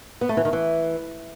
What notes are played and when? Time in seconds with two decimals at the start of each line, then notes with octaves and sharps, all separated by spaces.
0.21 B3
0.29 A3
0.37 E3
0.45 D#3
0.53 E3